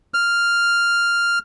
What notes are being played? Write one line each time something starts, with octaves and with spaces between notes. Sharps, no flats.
F6